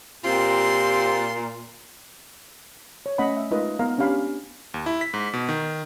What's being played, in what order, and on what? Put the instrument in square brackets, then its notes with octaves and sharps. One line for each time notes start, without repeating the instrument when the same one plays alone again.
[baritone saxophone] A#2 [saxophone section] C4 G4 [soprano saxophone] F4 [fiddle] C6
[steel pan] C#5
A3 C#4 D#5 F#5 B5
E5
G#3 D#4 F4 A#4 B4 D#5
B3 A#4 F5 A#5
C#4 D4 G4 F5 B5
[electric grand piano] D#2
E4
B6
G#2
B2
D#3